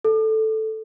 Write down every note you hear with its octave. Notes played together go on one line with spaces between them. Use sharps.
A4